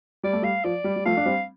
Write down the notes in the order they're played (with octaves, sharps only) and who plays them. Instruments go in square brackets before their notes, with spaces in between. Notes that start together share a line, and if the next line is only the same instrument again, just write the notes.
[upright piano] G3 [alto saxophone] D5
[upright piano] A3
[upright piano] G3 [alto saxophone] F5
[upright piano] F3 [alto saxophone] D5
[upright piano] G3
G3
[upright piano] F3 A3 [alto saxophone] F5
[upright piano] D4
G3 C4